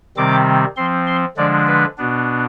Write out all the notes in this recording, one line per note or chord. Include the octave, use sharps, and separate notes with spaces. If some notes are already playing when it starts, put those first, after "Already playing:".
C3 D#3 G3 C4 D6
F3 C4 C6
C6
D3 F3 G#3 D4 D5
B4
B2 B3 D4